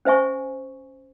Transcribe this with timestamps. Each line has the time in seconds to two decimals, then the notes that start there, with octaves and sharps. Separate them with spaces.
0.05 C#4 C5 E5 G#5 C#6